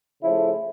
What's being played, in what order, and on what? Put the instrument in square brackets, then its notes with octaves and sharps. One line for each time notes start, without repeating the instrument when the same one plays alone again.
[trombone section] C#3 F3 A3 E4